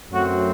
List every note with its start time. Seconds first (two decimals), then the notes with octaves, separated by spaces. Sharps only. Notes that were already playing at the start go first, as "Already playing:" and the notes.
0.10 F#2 F#3 A3 C4 F#4